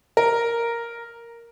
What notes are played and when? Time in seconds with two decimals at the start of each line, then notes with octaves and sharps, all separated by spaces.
0.17 A#4